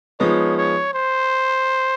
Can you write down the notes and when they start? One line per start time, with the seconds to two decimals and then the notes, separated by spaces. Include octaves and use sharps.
0.20 F3 G#3 B3 D#4 C#5
0.57 C#5
0.94 C5